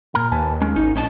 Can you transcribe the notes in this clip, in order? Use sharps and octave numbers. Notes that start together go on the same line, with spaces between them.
A#2 A#4
D#2 B4 G#5 A5
G#3 C#4
G#1 D#4
A#1 C#4 D#5 A5